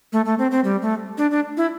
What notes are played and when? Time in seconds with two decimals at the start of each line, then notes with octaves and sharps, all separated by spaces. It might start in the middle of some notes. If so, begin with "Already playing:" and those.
0.13 A3
0.25 A3
0.39 C4
0.51 C4
0.64 G3
0.82 A3
1.18 D4
1.31 D4
1.57 E4